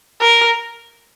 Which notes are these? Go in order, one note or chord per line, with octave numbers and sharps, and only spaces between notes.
A#4